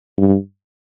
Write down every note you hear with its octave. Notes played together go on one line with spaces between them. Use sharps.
G2